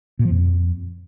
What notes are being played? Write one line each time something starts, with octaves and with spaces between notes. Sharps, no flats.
A#2
F3
F2